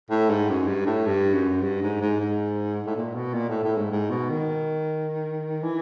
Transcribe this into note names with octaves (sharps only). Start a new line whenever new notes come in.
A2
G#2
F#2
G2
A2
G2
F#2
G2
G#2
G#2
G#2
A2
A#2
B2
A#2
A2
A2
G#2
G#2
B2
D#3
E3